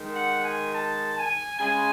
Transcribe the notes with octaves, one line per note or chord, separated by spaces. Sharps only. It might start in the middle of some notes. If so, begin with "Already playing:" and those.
Already playing: D#3 G#3
F#5
G#5
A5
G#5
C#3 G#3 G#5